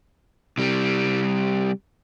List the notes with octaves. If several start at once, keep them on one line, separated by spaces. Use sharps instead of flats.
C3 G3